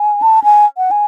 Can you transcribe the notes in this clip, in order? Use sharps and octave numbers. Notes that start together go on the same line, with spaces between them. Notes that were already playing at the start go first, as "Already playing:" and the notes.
Already playing: G#5
A5
G#5
F#5
G#5